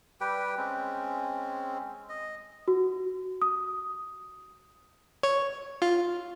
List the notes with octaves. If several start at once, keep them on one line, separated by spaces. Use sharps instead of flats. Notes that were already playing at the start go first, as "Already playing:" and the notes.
G3 G4 B4 G5
G#3 C4 C#4
D#5
F#4
D#6
C#5
F4